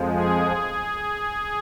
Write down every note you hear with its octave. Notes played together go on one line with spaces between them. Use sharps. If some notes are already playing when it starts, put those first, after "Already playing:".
Already playing: F2 F3 G#3
G#4